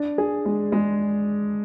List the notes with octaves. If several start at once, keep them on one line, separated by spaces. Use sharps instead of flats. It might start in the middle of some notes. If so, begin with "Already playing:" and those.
Already playing: D4
G#4
G#3
G#3